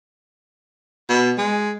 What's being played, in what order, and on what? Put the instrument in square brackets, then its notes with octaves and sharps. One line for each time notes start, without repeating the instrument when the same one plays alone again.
[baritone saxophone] B2
G#3